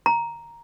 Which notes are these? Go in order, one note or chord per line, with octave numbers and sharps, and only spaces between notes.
A#5